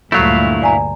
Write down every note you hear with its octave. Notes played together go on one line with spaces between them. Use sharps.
D2 G2 A#2 F#3 A3 E4 F5
D5 G#5 A#5